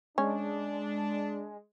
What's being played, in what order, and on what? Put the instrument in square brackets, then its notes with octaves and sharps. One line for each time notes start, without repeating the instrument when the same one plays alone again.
[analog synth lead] G#3 [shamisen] C#4 [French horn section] D4